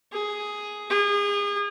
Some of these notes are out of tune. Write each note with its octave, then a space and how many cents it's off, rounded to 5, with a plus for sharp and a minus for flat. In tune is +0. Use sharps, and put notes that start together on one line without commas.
G#4 +5
G#4 -35